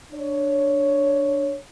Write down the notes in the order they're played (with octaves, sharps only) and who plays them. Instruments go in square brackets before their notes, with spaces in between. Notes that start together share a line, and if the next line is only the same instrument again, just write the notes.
[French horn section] D4 C#5